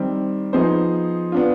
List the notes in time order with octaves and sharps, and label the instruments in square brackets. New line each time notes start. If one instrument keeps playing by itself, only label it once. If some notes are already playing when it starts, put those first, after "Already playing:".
Already playing: [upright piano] D#3 G3 C4
F3 B3 D#4 G#4 C5
B3 D4 F4